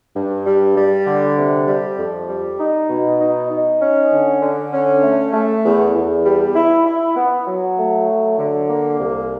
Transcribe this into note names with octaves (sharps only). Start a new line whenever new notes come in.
G2
G3
G3
D3
C3
G3
F2
G3
D#4
B2
D#4
D#4
C#4
D3
D3
C#4
A3
A3
E2
E2
G3
E4
E4
B3
F#3
A3
F#3
D3
A#3
C2